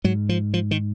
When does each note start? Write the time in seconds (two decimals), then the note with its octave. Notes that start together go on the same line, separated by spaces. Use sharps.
0.04 G#2 F#3
0.29 F3
0.54 F3
0.71 D#3